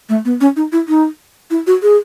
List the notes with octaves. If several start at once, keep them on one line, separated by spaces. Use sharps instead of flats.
A3
B3
C#4
D#4
E4
D#4
E4
F#4
G#4